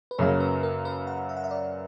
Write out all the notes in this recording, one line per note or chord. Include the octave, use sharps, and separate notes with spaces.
B4
F#2 C#3 F#3 A#3 C#5
B4
A#4
B4
F#5
E5
F#5
E5
D5